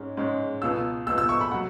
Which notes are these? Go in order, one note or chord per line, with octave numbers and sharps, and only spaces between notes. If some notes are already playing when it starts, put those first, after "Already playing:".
Already playing: G#2 G#3 C#4
G#2 G#3 C#4
C#2 B2 B3 E6
C#2 B2 B3 E6
E6
C#6
B5
F#3 F#5